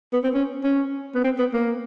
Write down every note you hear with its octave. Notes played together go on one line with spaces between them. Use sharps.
B3
C4
C#4
C#4
B3
C4
B3
A#3